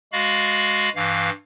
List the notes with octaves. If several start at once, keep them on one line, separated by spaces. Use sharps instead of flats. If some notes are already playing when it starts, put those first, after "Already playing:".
G#3 F#4 F5 B5 A6
G2 E3 F5